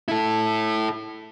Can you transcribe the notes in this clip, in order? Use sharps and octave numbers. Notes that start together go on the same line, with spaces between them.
E4 A4